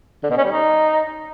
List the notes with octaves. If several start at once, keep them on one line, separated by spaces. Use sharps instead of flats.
D3
B2
C#4
G3
D#4